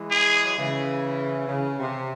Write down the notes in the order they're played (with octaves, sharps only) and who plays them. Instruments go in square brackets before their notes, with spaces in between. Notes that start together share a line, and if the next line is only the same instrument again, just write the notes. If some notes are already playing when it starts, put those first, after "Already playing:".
Already playing: [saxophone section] E3 G#3
[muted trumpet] G#4
[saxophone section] F#3
C#3 E3
C#3
C3